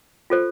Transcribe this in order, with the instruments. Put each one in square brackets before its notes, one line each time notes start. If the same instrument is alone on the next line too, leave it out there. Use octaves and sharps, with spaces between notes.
[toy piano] F4 A4 C5